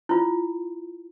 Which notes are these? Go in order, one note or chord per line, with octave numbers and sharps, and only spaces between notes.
E4 F4